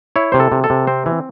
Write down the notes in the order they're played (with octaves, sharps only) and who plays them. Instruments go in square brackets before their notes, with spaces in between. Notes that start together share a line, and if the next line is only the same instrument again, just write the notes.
[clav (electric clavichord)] E4 C#5
C3 C5
A4
C3
A4
C3
C4 C5
E3